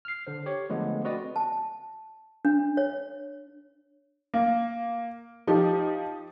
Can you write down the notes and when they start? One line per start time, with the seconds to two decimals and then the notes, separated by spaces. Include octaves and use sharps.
0.05 F6 C7
0.27 D3 C5
0.46 G4 C#5
0.70 D3 F3 G#3 A3 B3
1.04 C4 F#4 B4 D5 D#5
1.36 A5
2.45 D4
2.77 C#5
4.34 A#3
5.47 F3 D#4 G4